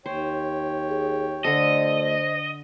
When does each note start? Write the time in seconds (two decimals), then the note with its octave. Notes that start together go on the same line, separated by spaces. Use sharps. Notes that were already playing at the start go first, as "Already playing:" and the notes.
0.06 D#2 C5 C#5 G5
0.89 G#4
1.45 D2 D3 A4 C5 D#5